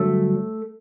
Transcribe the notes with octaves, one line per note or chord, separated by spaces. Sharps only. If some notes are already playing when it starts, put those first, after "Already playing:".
Already playing: G2 D3 F#3 A3